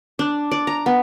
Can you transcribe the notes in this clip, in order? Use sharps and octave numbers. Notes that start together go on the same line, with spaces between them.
D4
D5
A#5
B3